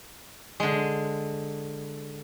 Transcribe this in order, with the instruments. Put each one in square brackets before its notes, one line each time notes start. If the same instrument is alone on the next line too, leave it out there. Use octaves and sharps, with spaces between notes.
[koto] D3 G#3